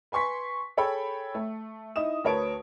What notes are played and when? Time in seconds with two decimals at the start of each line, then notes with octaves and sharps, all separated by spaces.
0.12 B4 G#5 C6 C#6 B6
0.77 G#4 A4 C#5 G5 B5 E6
1.34 A3
1.96 D#4 E4 D#6 E7
2.24 D2 A#4 B4 C#5 A5 D7